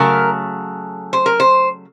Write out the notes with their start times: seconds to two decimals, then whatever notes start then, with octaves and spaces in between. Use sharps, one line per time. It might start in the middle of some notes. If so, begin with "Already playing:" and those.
Already playing: C#3 F#3 A3 A#4
1.13 C5
1.26 A#4
1.40 C5